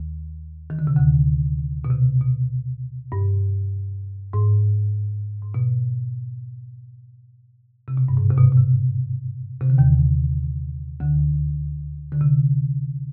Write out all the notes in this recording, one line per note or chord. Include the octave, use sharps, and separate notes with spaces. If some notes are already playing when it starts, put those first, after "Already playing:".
Already playing: D#2 D#3
D#3
D3
C3
D2 D3
B2
C3
B2
G2
G#2
G#2
B2
C3
B2
G2
G#2
C3
B2
B2
C3
C3
D3
D#2 D#3
D2 D3
D3
C3